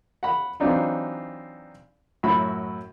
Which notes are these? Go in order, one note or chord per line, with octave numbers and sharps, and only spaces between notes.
F#5 B5
E3 F#3 C4 D4 D#4 F4
F#2 A2 E4 F#4 B5